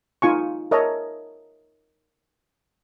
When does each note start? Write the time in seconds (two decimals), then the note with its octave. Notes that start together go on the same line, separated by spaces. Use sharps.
0.22 D#4 F4 G#5 C#6
0.71 A#4 C#5 D#5 E5 A5 A#5